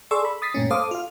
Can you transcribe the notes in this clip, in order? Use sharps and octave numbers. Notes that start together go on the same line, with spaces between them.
G#4 A4 D5 C6 C#6 E6
B5
D#6 A6 B6 C7
G2 A#2 A3 C#4
A4 C5 F5 D6 D#6
F4 F5